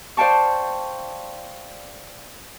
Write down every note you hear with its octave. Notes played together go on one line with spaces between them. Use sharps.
C5 D5 F5 G5 A5 C#6